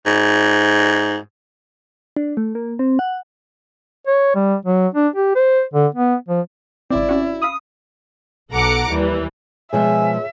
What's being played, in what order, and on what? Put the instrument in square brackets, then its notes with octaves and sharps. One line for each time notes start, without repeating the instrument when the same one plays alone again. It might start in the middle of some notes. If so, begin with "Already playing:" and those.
[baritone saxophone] G#2
[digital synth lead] D4
A3
A#3
C4
F#5
[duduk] C#5
G3
F#3
D4
G4
C5
D3
B3
F3
[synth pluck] G#1 C#3 C4 [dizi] E4 [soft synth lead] D5
[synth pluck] C#4 F#4
[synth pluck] F5 B5 E6 [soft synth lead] D#6
[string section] B1 A4 F#5 A#5 D6 C#7
D#2 E3 G3
[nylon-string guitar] B2 F3 G#3 [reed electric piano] G#4 C#5 [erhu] E5 [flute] G#5